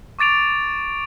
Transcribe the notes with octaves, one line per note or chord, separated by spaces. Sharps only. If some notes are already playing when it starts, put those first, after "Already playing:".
C#6 D6 A6 D7 F7